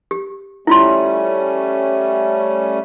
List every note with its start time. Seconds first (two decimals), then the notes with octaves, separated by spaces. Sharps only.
0.11 G4
0.67 G3 A3 C#4 E4 F4 C6